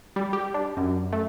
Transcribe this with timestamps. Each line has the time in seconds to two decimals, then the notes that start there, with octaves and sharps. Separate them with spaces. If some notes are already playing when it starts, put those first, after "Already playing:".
0.16 G3
0.33 G4
0.54 D4
0.77 F#2
1.13 A3